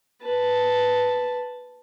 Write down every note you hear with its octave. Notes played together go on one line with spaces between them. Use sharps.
B4 A5